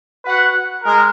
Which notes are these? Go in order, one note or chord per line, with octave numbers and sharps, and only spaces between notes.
F#4 B4 F#5
G#3 A#4